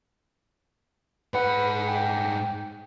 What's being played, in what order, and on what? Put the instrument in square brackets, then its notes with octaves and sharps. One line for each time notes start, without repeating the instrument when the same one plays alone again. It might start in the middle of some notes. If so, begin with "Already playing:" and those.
[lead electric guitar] G#2 F#5 [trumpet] B4
[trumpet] G5